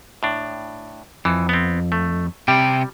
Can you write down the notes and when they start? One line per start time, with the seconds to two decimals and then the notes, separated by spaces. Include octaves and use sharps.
0.23 A2 D4
1.25 F2 E3
1.49 B3 C4
1.92 A3
2.48 C3 G3 G5